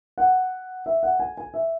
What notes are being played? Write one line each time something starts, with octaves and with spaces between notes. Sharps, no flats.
F#5
E5
F#5
G#5
G#5
E5